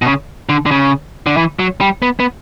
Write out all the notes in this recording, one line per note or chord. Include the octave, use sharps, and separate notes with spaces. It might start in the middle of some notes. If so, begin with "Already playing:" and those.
B2
C#3
D3
D3
C#3
D3
E3
F#3
G3
B3
B3